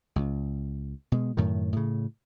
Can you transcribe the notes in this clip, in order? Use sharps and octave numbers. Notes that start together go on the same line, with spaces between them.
C#2
B2 G#3
F#2 A2 D#3
A2 C#3